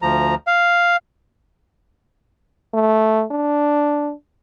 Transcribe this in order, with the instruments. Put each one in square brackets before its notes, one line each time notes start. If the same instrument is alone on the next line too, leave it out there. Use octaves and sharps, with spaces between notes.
[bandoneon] D2 F3 A#5
F5
[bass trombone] A3
D4